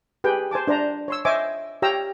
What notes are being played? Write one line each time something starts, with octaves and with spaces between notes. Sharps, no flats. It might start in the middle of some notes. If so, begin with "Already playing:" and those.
G4 G#4 B4 G5
C5 G#5 A5 D6
D4 C5 D5 A#5
C#5 C6 E6
C5 C#5 D#5 E5 G#5 D6
G4 C#5 F5 G5 A#5 E6